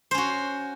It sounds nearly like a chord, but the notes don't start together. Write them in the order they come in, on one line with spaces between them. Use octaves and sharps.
C5 C#4 F#4